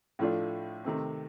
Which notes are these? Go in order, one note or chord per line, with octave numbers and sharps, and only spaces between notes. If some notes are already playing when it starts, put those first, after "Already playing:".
A2 F3 A3 D4 F4
C3 D#3 A3 C4